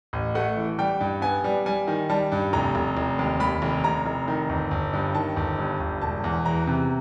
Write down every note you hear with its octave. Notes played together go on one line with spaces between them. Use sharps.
A1
A3 F#5
E3
G3 G5
G2
B3 G#5
G3
G3 G#5
D#3
G3 A5
G2
F1 A#5
F1
F1
D#2
D#2 B5
F1
F1 A#5
F1
D#3
G1
G1
G2
D#3 A5
G1
G2
G1
E1 A5
E2
E3 A#5
C3